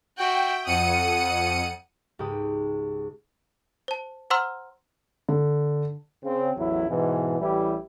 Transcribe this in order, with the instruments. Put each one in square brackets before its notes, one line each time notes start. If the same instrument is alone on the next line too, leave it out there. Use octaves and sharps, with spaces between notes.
[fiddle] F#4 E5 [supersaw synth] G5
[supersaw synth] F2 C#7 D#7 [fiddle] F#5 D#6
[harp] C#2 G#2 G4 B4 G5 D#6
[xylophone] C5 A5
C5 F#5 A#5 C6 E6 F6
[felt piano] D3
[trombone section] C#3 C4
A1 E2 F#3 E4
G#2 B2 E3
A1 E3 G3 E4 G4